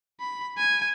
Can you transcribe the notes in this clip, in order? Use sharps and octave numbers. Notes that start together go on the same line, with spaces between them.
B5
G#5